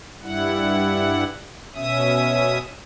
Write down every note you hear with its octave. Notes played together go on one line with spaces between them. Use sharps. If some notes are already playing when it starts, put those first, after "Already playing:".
G2 G3 E4 F#5
B2 C#4 E5 D#6